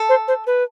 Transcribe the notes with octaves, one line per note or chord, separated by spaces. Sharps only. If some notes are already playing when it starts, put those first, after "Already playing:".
Already playing: A4
C5
C5
B4